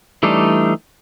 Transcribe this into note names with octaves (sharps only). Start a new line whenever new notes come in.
E3 G3 A3 D4 D#4